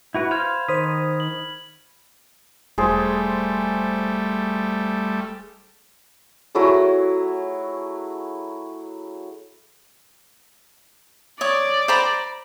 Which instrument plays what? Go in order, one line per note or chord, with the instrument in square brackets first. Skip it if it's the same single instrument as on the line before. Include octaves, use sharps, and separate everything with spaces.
[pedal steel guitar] E4 F#4 B4 [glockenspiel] B5
[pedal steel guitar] C5 F5 [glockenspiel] F6 G#6 F7
[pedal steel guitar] D#3 [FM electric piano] C5 D#6 [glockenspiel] B6
[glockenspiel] F#7
[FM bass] E1 [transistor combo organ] G3 A3 [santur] G#4 C5
[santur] F#3 A3 E4 G#4
[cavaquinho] C#5 D#6 [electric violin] D5
[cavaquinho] C5 A#5 B5